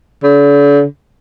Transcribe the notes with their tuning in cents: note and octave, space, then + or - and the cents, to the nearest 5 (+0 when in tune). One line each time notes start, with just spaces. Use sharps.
D3 -40